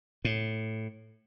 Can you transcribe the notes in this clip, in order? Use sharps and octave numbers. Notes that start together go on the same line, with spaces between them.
A2